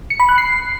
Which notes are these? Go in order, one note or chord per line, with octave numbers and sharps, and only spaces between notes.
C#7
B5
F#6
C7